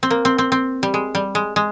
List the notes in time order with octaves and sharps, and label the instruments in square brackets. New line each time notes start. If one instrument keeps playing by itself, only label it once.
[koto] C4
A#3
C4
C4
C4
G3
G#3
G3
G#3
G#3